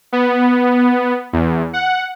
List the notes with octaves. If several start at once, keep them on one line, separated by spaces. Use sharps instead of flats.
B3
E2
F#5